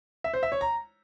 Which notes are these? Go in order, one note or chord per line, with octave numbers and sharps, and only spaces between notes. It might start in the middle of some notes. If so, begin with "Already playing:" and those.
E5
C5
E5
C#5
A#5